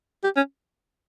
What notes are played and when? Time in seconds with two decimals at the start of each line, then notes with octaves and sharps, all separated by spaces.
0.24 G4
0.36 C#4